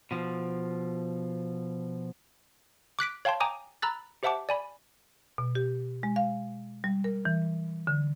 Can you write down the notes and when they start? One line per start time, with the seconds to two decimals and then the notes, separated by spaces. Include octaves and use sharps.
0.11 B2 F3
2.99 D6 F#6 B6 D7
3.25 C#5 F5 G5 A5 C6
3.40 G5 G#5 A#5 D6 D#6
3.82 A#5 B5 E6 F#6 A6
4.23 G4 C5 E5 F#5 A5 D6
4.49 D5 G#5 B5
5.38 B2
5.55 G4
6.03 G#3
6.16 F5
6.84 G3
7.04 A#4
7.25 E3
7.87 D3